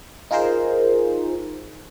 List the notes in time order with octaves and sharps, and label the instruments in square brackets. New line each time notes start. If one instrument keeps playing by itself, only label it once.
[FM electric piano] D#4 F4 G#4 A#4 C5